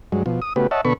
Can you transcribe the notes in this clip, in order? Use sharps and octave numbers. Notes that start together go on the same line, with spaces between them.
G2 F#3 G#3
B2 F3
D#6
C#3 A3 B3 F#4 G4 B4
C#5 D#5 E5 F#5 A5
B2 D3 B3 A4 B5 C#6